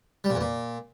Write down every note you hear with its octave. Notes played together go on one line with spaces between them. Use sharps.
G3
A#2
E2
A#2